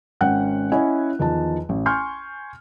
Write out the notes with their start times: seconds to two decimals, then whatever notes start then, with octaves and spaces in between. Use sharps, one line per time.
0.21 G#1 C#4 F#5 G5 F#6
0.72 C#4 E4 C#5 D#5 F#5 G#5
1.19 E2 D#3 F3 A5
1.69 A1
1.86 G#5 C6 C#6 F6 G6